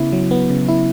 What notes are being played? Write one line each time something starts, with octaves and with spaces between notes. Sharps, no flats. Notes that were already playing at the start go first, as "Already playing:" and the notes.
Already playing: C#3 B3 E4
F#3
B3
C#3
E4